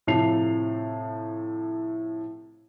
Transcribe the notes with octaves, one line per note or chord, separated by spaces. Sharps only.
A2 C3 F3 A5 C7 F7